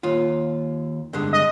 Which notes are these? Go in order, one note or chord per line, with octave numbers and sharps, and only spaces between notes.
D#2 F4
G2 D3 G#3
D#5